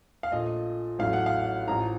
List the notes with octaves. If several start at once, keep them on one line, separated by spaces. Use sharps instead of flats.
F5
A#1 A#2 A3 D#5
A1 A2 F#3 A3 F5
F#5
F5
A1 A2 F3 A#5